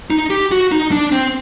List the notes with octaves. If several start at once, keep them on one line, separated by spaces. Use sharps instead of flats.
D#4
G4
F#4
D#4
D4
C4